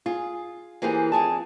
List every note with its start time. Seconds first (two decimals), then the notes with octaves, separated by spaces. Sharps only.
0.06 F4 G#4
0.82 E3 A#3 G4 G#4 C5
1.12 F2 G#4 A5